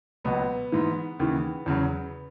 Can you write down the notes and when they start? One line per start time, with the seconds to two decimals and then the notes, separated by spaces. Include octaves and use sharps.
0.24 C#2 B2 F#3 B3
0.72 G#2 E3
1.20 D#2 C#3 E3
1.66 E2 C#3 F#3